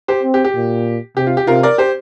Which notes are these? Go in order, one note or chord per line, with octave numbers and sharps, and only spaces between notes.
G4 C5
C4
G4
G4
A#2
C3 G4
F4
G4
C3 F4 A#4
A#4 D5
G4 C5